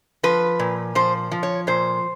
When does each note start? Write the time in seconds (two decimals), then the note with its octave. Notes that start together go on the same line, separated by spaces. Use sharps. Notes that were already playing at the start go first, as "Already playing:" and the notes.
0.23 F3 B4
0.59 A#2
0.95 F3 C5
1.31 F3
1.43 C#5
1.67 A#2 C5